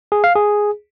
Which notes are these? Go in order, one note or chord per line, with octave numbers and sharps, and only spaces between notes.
G#4
F5
G#4